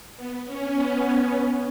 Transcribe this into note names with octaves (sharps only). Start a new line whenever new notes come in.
B3
C#4
B3
C#4